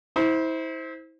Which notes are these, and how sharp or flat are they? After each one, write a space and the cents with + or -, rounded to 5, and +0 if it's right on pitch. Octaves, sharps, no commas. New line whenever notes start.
E4 -35 C5 +0